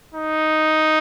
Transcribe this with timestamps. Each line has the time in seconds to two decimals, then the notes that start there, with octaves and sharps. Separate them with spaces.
0.14 D#4